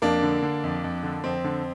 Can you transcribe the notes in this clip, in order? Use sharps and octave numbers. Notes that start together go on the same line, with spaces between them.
F2 A#3 D4
D3
D3
F2
F2
D3
F2 C4
D3